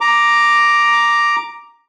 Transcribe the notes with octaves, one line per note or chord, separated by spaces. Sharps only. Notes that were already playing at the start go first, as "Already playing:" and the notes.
A#5 D6